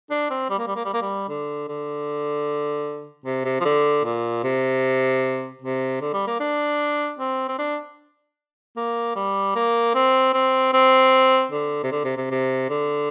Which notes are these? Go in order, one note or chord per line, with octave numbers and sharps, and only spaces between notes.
D4
C4
G3
A#3
G3
A#3
G3
A#3
G3
D3
D3
C3
C3
F3
D3
A#2
C3
C3
D3
G3
A#3
D4
C4
C4
D4
A#3
G3
A#3
C4
C4
C4
D3
C3
D3
C3
C3
C3
D3